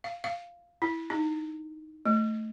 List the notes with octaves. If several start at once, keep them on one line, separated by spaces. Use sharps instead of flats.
F5
F5
E4
D#4
A3